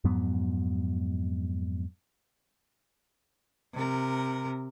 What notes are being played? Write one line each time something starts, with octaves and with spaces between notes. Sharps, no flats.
F2 G#2 F#3 B3
C3 A#4